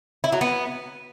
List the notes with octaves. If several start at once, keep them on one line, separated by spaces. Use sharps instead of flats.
E4
F#3
B3